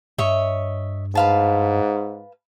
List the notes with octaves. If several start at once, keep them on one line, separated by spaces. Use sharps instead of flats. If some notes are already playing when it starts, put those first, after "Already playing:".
G2 C#5 D#5 E5
G#2 B4 F5 A5